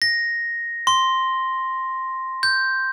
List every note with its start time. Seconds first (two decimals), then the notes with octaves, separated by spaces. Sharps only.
0.02 A#6
0.87 C6
2.43 G6